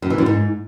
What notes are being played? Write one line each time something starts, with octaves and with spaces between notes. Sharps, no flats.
F#2
E3
F#2
G#2